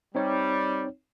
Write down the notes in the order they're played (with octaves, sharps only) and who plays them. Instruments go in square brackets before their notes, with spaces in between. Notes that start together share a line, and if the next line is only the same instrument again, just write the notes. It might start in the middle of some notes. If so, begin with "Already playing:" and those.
[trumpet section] G3 [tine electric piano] C4 D#4 C#5